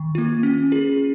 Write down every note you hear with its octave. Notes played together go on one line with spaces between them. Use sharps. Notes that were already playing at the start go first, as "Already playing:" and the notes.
Already playing: D#3
A#3 F4
C#4
F4 G#4